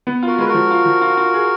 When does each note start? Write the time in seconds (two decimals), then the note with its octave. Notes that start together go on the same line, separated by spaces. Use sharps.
0.07 B3
0.23 F4 F#4 A#4
0.38 G#3 B4
0.48 F#4 A#4
0.54 F3
0.71 F4
0.85 F3
1.01 F4
1.17 F4
1.34 G#4